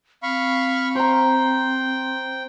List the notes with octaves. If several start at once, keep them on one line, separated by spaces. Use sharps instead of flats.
C4 F5 B5 C#6
C5 G5 A#5